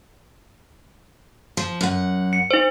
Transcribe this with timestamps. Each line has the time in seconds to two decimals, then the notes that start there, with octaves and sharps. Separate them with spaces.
1.57 F3
1.81 F#2 F#5
2.33 C#7
2.51 D#4 C5